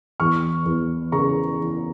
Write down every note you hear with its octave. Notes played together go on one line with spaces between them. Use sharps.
E2 C#6 F6
E2
C#3 A#5 C#6
E3